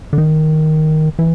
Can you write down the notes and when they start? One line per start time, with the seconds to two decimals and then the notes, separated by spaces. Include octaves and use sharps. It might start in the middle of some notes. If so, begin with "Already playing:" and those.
0.13 D3
0.18 D#3
1.19 E3